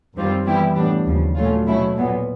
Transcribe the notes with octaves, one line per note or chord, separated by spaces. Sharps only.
F#2 D#3 G3 C4 F4
E3 G3 B3 E4 G4
A2 E3 G3 B3 D4
D#2 C#3 F3
A#2 F#3 A3 C#4 F4
B2 F#3 A3 C#4 E4
A#2 F#3 B3